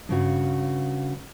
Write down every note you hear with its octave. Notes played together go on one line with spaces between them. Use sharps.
G2 C#3 F#4